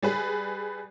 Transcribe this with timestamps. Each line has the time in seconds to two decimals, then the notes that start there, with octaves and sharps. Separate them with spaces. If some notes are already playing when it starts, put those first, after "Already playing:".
0.02 G3 G#4 B4